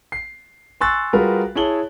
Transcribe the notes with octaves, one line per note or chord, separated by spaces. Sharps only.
C7
G#5 C6 C#6 E6 F#6 A6
G3 F4 F#4 G#4 A#4 B4
E4 G#4 C#5 A5 F#7 G7